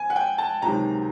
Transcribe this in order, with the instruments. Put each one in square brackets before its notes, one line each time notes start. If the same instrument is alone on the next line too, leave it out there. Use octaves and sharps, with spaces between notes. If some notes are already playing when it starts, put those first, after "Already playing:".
Already playing: [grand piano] F2 G#5
F#5
G5
A5
C#2 C3 D#3 F#3 A#5